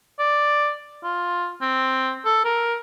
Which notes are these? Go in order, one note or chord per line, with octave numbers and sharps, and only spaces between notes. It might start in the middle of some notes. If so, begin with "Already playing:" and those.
D5
F4
C4
A4
A#4